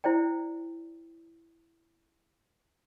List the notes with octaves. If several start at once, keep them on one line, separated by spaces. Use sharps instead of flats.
E4 C5 D5 G5